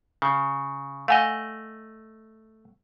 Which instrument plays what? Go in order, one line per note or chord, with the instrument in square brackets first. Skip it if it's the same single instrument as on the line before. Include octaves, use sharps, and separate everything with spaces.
[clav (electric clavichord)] C#3
[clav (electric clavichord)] A3 D#5 [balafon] F5 F#5 G#5